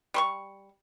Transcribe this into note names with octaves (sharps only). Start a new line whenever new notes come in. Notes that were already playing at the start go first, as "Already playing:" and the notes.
G3 C6 C#6